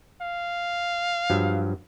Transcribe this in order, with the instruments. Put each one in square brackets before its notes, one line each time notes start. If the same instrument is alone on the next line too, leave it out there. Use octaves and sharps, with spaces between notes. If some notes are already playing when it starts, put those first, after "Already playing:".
[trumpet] F5
[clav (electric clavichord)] G2 F3 F#3